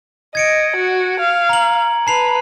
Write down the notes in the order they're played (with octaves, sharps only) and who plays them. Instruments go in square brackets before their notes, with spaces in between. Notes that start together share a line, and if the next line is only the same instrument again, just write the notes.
[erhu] D#5 [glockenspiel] G#6 C#7 D7
[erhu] F#4
F5
[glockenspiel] A#5 F#7
[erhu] B4 [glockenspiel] A5 C7 F7